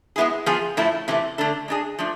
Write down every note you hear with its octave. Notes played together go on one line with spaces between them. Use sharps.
G#3 B3 E4 G#4
F3 B3 F4 G#4
A2 F3 A3 E4
C3 E3 A3
D3 A3 D4 A4
G#3 D4 G#4
F3 A3 D4